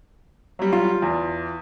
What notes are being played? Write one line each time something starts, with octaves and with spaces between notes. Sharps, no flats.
F#3 G3
F4
E2